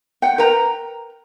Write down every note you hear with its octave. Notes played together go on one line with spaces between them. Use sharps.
F#5 G5
A#4 B4 G5 A#5